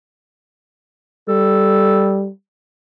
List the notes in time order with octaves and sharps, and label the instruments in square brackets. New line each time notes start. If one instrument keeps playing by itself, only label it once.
[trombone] G3 [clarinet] A4